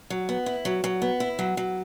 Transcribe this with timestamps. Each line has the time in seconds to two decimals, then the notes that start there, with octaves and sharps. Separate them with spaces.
0.10 F#3
0.29 B3
0.46 E4
0.65 F#3
0.84 F#3
1.02 B3
1.20 E4
1.39 F#3
1.57 F#3